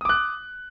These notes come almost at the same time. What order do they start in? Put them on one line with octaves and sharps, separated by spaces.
D#6 D6 F#6